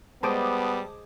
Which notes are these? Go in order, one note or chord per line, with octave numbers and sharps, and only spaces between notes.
G3 G#3 B3 C5 A5 D6 D#6